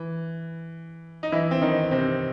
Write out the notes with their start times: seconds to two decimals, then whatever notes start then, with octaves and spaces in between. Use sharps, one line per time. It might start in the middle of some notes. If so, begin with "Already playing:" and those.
Already playing: E3
1.23 D#4
1.32 E3 E4
1.51 C4
1.62 D#3 D#4
1.91 C3 C4